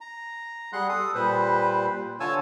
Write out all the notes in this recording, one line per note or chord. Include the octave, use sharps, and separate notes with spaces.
A#5
G3 G#4 F#5 C6 F#6
A4 D#6
A#2 G3 B4 C5
D3 F4 C#5 G#5 A5 E6